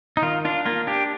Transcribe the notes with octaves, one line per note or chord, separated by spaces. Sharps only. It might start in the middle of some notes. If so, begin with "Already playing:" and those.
D#4
D#3 F4
D4 F4
A#3 F4
D4 G4